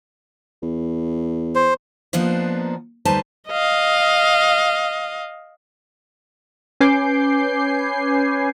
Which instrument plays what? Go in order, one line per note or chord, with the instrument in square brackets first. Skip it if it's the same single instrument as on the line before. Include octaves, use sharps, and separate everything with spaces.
[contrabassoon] E2
[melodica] C5
[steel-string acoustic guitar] F3 A#3 B3 D4 D#4 C5
D2 G3 D#4 B4 C5 A5
[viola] D#5 F5
[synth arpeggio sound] C#4 B4 G#5 D6 G6 C7